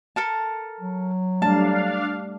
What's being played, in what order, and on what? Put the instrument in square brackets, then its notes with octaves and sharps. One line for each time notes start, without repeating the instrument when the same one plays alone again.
[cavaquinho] A4 A#4 A5
[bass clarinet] F#3
[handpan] G3 A3 [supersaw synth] D4 F5 [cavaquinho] A5